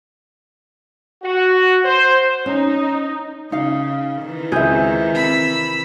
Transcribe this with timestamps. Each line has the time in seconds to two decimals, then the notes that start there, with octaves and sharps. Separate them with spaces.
1.23 F#4
1.85 C5
2.46 C#4 D#4
3.52 C#3 D#4 F5
4.22 D#3 E3
4.52 C#2 C4 G#4 E5 G6
5.14 C3 B5 E6